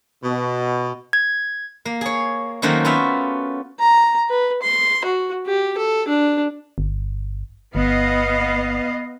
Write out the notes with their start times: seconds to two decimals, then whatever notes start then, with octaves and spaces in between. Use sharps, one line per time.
0.22 B2
1.13 G#6
1.85 A#3
2.01 G#4 C#5
2.62 D#3 F#3 A3 A#3 C4 C#4
2.85 B3 C#4 F4 F#4 E5
3.80 A#5
4.29 B4
4.62 C6
5.04 F#4
5.46 G4
5.77 A4
6.08 D4
6.78 G1
7.75 G1 B3 D#5 F5